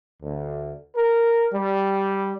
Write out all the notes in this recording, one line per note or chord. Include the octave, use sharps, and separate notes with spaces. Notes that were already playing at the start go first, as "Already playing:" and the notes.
D2
A#4
G3